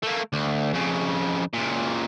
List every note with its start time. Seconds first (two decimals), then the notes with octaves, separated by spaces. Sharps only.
0.03 A3 A#3
0.33 D2
0.73 F2 C#3
1.54 C#2 A#2